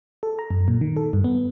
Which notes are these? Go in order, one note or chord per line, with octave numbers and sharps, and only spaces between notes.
A4
A#5
F#2
A#2
D#3
A4
G2
B3